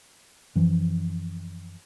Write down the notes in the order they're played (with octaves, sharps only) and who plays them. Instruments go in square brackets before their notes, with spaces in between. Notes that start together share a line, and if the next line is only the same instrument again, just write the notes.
[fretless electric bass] F#2 E3 F3